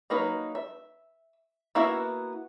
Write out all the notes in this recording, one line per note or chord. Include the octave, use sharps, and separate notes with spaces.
F#3 A#3 D#4 B4
E5
A#3 B3 E4 F#4 E5